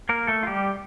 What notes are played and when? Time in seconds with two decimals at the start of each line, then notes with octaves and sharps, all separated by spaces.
0.09 A#3 A#4
0.27 A3 A4
0.43 F4
0.47 G3 G4